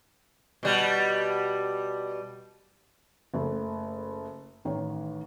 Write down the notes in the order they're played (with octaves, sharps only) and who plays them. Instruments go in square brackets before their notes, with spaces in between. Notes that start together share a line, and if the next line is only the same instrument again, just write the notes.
[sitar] B2 G3
[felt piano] F#1 A3
A1 D#3 C#5